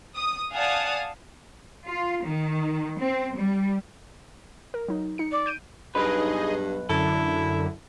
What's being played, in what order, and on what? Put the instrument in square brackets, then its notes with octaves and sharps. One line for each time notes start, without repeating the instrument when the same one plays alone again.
[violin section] D#6
D5 F5 F#5 G#5 A5 D#6
[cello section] F4
D#3
C4
G3
[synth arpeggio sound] A#4
F#3 D#4
D#4 C#7
[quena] D5
[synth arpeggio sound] G6 D7 D#7
[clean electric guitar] B1 B4 [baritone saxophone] G2 [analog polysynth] D#4 G#4 D#5
[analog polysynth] F#2 D3 [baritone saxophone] E4 [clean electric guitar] A4